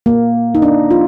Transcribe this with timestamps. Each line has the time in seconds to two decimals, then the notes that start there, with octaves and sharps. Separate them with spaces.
0.06 A#3
0.55 D#4
0.62 D4
0.91 F4